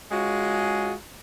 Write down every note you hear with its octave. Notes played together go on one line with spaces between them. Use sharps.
G#3 C#4 F4 F#4 G#4